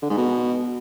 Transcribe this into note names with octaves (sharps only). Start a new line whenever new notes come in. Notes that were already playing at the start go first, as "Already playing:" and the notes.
D3
G#2
B2